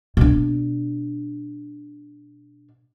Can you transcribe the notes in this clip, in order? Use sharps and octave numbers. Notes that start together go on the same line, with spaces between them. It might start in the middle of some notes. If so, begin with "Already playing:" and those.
B2 D4